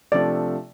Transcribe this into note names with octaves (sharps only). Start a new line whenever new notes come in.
C3 F3 A3 D4 D5